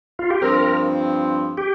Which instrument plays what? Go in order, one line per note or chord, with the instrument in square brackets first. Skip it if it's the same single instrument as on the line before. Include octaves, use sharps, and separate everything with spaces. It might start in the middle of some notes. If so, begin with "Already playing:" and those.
[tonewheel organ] F4
G4
[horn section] G2 F3 C4 [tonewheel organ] A#4
[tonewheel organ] G4